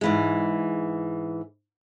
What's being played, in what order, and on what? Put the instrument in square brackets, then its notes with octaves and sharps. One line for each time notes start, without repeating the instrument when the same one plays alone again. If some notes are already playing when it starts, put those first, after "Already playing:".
[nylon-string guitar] G#2 E3 G#3